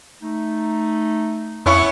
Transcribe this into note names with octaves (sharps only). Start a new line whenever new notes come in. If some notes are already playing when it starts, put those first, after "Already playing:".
A3 D#4
F2 B3 C#4 E4 C#6